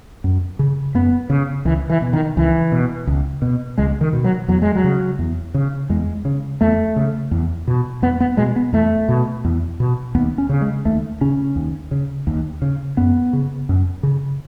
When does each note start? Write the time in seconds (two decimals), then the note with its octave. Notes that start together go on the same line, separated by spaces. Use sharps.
0.24 F#2
0.59 C#3
0.95 F#2 B3
1.30 C#3
1.65 C#2 E3
1.90 E3
2.01 B2
2.13 D#3
2.37 C#2 E3
2.72 B2
3.07 C#2
3.42 B2
3.78 C#2 G#3
4.01 D#3
4.13 B2
4.24 F#3
4.48 E2 F#3
4.62 G#3
4.75 F#3
4.84 C#3
5.19 E2
5.54 C#3
5.89 E2 G#3
6.25 C#3
6.61 E2 A3
6.96 C#3
7.31 E2
7.67 B2
8.02 E2 B3
8.20 B3
8.37 B2 G#3
8.56 B3
8.73 E2 A3
9.09 B2
9.44 E2
9.80 B2
10.15 D#2 B3
10.38 C#4
10.49 C#3
10.61 G#3
10.85 D#2 A3
11.21 C#3 C#4
11.56 D#2
11.91 C#3
12.27 D#2
12.62 C#3
12.97 F#2 B3
13.33 C#3
13.69 F#2
14.03 C#3